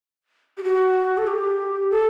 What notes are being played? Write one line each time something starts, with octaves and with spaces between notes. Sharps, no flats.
G4
F#4
A4
G4
A4